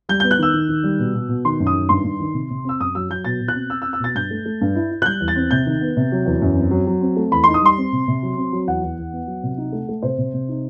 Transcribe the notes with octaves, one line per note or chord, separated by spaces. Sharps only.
G3 G6
B3 G6
F#6
D#3 E6
D#3
D#3
G3
B2
B2
B2
D#3 C6
F#2
D#6
D#3
G2 C6
G2
D#3
C3
C3
C4 E6
F#2 D#6
F#3 E6
F#3 G6
B2 A6
B2
F#6
C4
C4 E6
E6
C4
E6
B2 A6
G2 G6
A3
A3
G2
E4
E4
F#6
G3 G6
E2
A6
C4
C3 G6
D#3
B3
C3
F#3
E2
F#2
C4
F#3
F#3
C4
A3
E2 B5
D#4 C6
D#6
G3 C6
C4
C3
C3
F#3
C4
F#3
E2 F#5
E2
E2
B3
F#3
C3
D#4
A3
A3
C3 C5
C3
C3
D#4